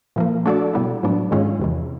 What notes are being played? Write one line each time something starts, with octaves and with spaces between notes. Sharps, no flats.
A#2 F3 A#3
A3 D4 F#4 A4 D5
B2 G3 B3 E4
A2 F#3 B3 D4
G#2 D#3 G#3 C#4 F4
E2 C3 E3